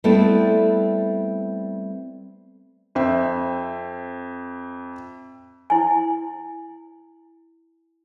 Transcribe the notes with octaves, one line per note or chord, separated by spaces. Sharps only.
G3 A3 B3 C4 E4 A4
F2 C5 E5
E4 G#5